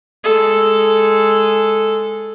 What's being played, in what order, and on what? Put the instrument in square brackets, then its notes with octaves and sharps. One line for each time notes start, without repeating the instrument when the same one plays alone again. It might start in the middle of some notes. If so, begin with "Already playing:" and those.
[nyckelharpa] G#3 A4